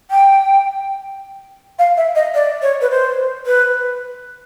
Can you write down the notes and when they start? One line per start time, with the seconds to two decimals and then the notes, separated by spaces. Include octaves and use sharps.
0.11 G5
1.79 F5
1.97 E5
2.15 D#5
2.35 D5
2.62 C#5
2.81 B4
2.91 C5
3.46 B4